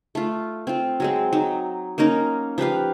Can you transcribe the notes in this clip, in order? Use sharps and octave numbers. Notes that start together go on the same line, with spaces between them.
A3 F4
C4 F4
F#3 G#3 C4
F#3 D#4
A#3 C#4 D#4 A#4
F3 G4 B4 F5